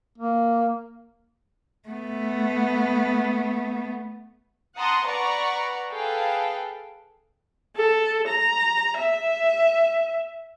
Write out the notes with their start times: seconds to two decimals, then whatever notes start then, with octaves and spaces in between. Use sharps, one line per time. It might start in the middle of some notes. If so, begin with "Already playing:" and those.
0.18 A#3
1.89 A3 B3
4.76 F#5 A5 A#5 C6 D#6
5.07 B4 D5 F#5 A#5 C#6
5.90 G#4 A4 B4 F5 G5
7.76 A4
8.28 A#5
8.99 E5